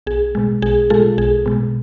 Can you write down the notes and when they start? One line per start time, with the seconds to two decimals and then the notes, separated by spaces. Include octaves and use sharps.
0.07 B1 G#4
0.35 B2 G#3
0.62 B1 G#4
0.90 B2 G#3 F4 A4
1.18 B1 G#4
1.46 B2 G#3